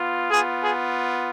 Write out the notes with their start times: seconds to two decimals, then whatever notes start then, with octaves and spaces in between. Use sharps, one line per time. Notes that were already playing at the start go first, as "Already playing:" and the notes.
Already playing: B3 F4
0.30 B3 F4 G#4
0.61 G#4